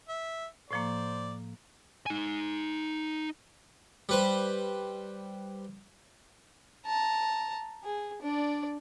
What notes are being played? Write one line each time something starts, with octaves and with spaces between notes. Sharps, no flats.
E5
A2 F3 A#3 C5 D5
D#4 G#5
G3 B4 C5
A5 A#5
G#4
D4 D5